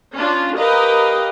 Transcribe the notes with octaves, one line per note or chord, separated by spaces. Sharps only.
C#4 D4 F4
G4 A#4 B4 D#5 F5